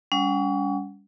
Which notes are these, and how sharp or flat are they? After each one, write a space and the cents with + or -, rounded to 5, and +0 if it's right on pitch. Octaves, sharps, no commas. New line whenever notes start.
G3 +30 C#4 +35 F#5 +0